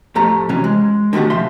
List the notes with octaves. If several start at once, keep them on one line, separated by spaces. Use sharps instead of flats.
F2 A2 A3 G4 A#5
C3 E3 F#3 C4 C#4
G#3
D3 D#3 A3 F#4 G4
C3 F3 E5 C6